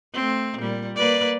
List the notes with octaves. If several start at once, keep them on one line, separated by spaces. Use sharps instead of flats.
A3 C4
A#2 G3
A#3 B4 D5